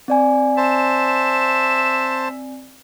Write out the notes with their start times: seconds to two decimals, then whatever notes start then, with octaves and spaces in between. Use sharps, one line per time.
0.08 C4 D5 G#5
0.57 C5 E5 A5